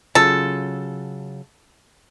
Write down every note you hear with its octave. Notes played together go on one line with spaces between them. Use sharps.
C#3 F#3 F4 A4